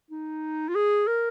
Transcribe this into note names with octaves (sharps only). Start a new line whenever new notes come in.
D#4
F4
G#4
A#4